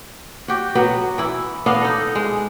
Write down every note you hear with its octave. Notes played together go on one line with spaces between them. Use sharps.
F#4 G4
F#3 B3 F#4 B4
E3 E4
B3 D4 D#5 F5
D#4 A4
G#3